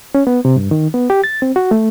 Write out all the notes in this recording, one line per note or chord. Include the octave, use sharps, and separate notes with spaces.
C#4
B3
C3
G2
D#3
B3
G4
A6
C4
F#4
A3